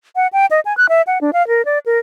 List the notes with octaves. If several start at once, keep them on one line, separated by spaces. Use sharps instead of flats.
F#5
G5
D#5
G#5
F#6
E5
F#5
D4
F5
A#4
D5
A#4